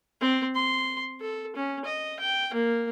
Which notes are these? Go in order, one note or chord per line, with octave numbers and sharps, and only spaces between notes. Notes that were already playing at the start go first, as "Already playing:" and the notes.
C4
C6
A4
C#4
D#5
G5
A#3